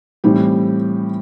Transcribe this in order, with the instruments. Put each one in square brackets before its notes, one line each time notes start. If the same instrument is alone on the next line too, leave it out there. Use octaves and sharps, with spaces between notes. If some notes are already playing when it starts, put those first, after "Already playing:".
[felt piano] A2 E3 G3 C4 G4